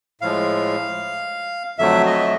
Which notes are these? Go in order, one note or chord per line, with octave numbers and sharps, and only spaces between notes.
A2 F3 G#3 F5
F2 D3 F#3 A3 E5
D#5